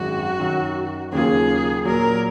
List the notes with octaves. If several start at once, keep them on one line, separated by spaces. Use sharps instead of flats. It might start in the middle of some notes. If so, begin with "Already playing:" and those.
Already playing: G#1 F#2 D#3 G#3 F#4
F#2 D#3 F#3
D#2 C#3 F#3 A#3 F4 G#4
A#2 F#3 A#3 A#4